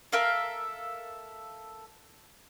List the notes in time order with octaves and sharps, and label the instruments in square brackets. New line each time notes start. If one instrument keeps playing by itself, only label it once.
[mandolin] A4 A#4 E5 F5